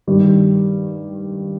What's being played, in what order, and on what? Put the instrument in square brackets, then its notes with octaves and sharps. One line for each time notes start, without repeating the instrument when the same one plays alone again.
[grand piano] G2 D#3 G3